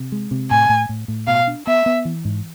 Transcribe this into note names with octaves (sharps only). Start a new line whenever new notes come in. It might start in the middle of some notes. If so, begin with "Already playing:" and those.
Already playing: C3
G#3
C3
A2 G#5
A2
A2
A2
B2 F5
D4
B3 E5
B3
E3
G#2